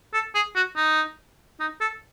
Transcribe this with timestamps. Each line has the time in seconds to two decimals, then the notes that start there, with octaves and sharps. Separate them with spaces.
0.13 A4
0.35 G#4
0.55 F#4
0.76 D#4
1.60 D#4
1.81 A4